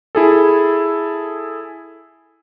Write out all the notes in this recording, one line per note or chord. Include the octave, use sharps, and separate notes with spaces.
E4 G#4 A4